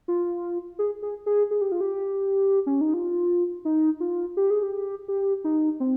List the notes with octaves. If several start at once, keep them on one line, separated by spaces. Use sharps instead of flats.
F4
G#4
G#4
G#4
G#4
G4
F4
G4
C#4
D#4
F4
D#4
F4
G4
G#4
G4
G4
D#4
C4